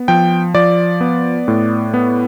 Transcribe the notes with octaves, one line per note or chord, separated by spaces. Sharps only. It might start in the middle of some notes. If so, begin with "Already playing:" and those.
Already playing: B3
F3 G5
F3 D5
B3
A2
B3